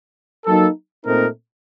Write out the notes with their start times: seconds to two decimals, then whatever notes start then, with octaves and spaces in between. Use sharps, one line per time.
0.46 F#3 A#3 D#4 A4
1.05 A#2 A3 C4 D#4 A#4